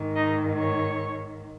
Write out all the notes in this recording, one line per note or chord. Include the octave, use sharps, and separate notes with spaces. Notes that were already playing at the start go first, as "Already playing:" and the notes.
Already playing: G#2 D#3
D#4 D#5
C#5 C#6